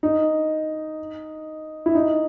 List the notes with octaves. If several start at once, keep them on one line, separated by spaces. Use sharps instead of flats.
D#4
E4
D#4